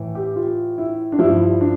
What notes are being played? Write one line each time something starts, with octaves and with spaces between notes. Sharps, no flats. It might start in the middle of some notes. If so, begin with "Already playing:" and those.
Already playing: A2 E3
G4
F4
E4
D4
G2 F3 E4
D4